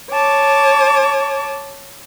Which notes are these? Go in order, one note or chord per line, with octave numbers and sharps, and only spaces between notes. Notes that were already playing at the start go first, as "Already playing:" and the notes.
C#5 A5 D6